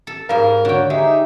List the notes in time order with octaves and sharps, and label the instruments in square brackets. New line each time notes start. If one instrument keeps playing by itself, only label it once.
[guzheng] A4
[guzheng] G#2 G3 [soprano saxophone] A#4 [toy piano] F5
[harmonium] D#2 F#4 C#5 [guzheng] D3 G5
[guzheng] G#3 [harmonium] D#4 G4 [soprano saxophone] E5